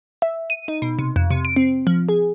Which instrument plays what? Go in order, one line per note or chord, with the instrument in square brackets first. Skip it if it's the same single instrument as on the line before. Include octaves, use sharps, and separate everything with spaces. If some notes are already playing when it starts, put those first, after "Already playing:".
[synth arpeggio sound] E5
D#7
D#4
B2
C3
F2
C3
D7
C4
F3
G#4